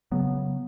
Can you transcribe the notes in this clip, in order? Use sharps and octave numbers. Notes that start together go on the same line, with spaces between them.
C#3 F#3 B3